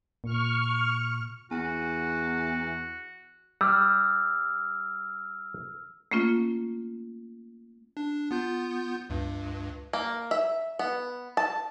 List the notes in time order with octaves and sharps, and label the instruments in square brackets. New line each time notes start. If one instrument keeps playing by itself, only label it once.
[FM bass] A#2 [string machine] C#6 F6
[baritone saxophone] E2 [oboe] F#4
[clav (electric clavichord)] G3 [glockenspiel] E6 F6
[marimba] A3 A#3 C#4 F4
[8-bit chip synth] D4
B3 F4 G6
C#2 G2
[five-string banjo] A#3
E5
B3
A5